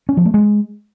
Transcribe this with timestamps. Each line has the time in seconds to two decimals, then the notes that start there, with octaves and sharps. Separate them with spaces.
0.09 C#4
0.17 F3
0.26 A3
0.34 G#3